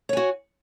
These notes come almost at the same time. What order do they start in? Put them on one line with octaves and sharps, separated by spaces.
C#5 G#5 F#4